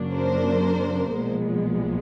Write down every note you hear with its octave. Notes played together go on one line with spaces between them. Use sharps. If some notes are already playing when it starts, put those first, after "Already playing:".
Already playing: F#2 C#3 F#3 A#3 D4
A#4 C5
B1 A#2 F3 G#3 B3